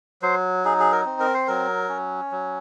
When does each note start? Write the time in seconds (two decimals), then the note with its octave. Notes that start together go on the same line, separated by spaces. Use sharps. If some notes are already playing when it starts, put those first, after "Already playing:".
0.22 F#3 C5
0.65 D#4 G#4
0.80 G#4
0.92 A#4
1.06 C4
1.20 A#4
1.34 C5
1.47 F#3 A#4
1.89 C#4
2.32 F#3